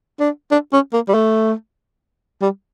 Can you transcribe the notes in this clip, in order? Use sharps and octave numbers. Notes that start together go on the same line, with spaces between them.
D4
D4
C#4
A#3
G3
A3
G3